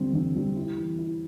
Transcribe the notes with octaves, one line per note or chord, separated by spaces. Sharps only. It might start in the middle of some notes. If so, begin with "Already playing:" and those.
Already playing: D3 G3 C4
D3
G3
E4
E3
E4